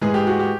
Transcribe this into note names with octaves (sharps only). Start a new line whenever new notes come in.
G#2 E3 G#3 G#4
G4
F#4
G4